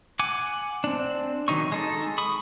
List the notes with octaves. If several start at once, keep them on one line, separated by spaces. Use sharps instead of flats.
F#5 G#5 D6
C4 D4
D#3 F#3 D#4 C#6
G#3 D#4 A4
B5 C#6 D#6